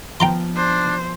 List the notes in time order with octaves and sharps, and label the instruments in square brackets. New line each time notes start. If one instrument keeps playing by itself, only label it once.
[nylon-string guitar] F3 B3 [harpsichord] G5 A#5 C6
[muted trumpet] D4 [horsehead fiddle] C5